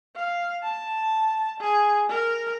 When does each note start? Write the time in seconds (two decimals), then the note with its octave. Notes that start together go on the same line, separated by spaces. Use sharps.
0.16 F5
0.63 A5
1.61 G#4
2.10 A#4